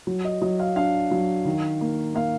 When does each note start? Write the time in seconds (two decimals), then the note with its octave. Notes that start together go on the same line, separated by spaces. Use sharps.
0.07 F#3
0.25 D#5
0.42 F#3 D#5
0.60 F5
0.76 D4 F5
1.11 F#3
1.45 D#3
1.81 A#3
2.15 A#3 F5